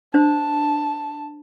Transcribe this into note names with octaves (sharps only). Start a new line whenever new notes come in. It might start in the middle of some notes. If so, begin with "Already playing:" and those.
D4 C5 A5